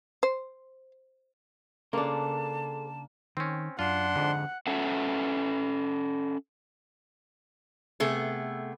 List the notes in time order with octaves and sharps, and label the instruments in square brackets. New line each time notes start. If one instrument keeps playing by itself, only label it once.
[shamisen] C5
[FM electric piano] C#3 [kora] A#3 D4 [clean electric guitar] G#4 A4 C5 [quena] A5
[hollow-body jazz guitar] D#3 [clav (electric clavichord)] C4 C#4
[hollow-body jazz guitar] F#2 [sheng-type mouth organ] D4 C6 [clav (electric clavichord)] F4 [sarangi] F#5
[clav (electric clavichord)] F2 G#2 [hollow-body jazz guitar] D3
[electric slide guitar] C#4 A4 E5 F#5
[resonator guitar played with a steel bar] C3 A3 B3 G#4